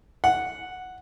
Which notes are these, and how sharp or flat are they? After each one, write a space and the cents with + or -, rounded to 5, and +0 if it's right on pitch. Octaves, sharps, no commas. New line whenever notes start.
F#5 -5